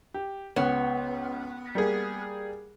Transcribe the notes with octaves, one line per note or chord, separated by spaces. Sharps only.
G4
C#2 B3 C#5
G3 A#3 G#4